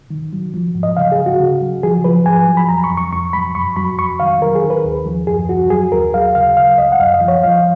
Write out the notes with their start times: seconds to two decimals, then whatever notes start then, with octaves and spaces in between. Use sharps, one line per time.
0.10 D#3
0.33 F#3
0.54 F3
0.75 G#2
0.83 D#5
0.97 C#3 F5
1.12 G#4
1.19 C#3
1.26 F#4
1.40 C#3
1.61 F#3
1.83 F3 G#4
2.04 F3 B4
2.26 G#2 G#5
2.47 F#3
2.57 B5
2.69 F2 A#5
2.84 C#6
2.91 F2
2.97 C#6
3.13 F2 C#6
3.33 F#3 B5
3.55 F#2 C#6
3.76 F#3 B5
3.98 F2 C#6
4.20 D#3 F5
4.41 D#3 A#4
4.55 G#4
4.64 D#3
4.70 B4
4.84 D#2
5.06 F3
5.27 F#2 G#4
5.49 F#2 F#4
5.70 F#3 G#4
5.92 D#2 A#4
6.14 F#3 F5
6.35 C#3 F5
6.57 C#3 F5
6.78 C#2 D#5
6.92 F#5
7.00 F#2 F5
7.14 D#5
7.21 F3
7.28 C#5
7.43 F3 F5